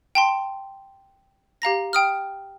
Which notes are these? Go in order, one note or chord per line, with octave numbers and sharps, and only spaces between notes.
G5 A5 C6
G4 F5 A#5 A#6
G5 D#6 F6